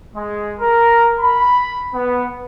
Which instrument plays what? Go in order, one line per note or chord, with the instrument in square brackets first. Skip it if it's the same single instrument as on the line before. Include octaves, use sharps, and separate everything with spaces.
[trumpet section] G#3
A#4
B5
B3